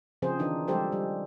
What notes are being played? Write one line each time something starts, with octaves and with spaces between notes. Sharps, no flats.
C#3 F3 C4 G#4 C5
D#3 E3 D4 D#4
F3 G3 G#3 G4 A4 C5
G3